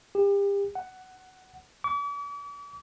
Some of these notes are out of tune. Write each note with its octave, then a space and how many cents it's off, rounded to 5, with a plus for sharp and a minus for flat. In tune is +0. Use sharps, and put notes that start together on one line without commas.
G4 +35
F#5 +10
D6 -45